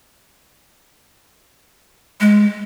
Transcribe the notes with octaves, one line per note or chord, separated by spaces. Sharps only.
G#3